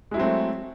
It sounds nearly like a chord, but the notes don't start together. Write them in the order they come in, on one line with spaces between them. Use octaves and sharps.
G#3 E4 F#3 C4 A3